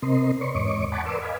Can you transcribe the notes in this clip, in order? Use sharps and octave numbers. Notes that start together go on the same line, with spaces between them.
C3 C4 A#4 D#5 C6
B4 C#5 D5 C6 C#6
E2 G#2 C#5 D#5 C#6 D6
F#5 G#5 A5 B5 C#6 D6
A#4 B4 D5 C6 D6 E6
D#5 F5 G#5 B5